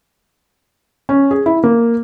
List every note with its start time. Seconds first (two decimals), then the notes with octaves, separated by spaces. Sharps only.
1.09 C#4
1.31 G#4
1.46 E4
1.64 A#3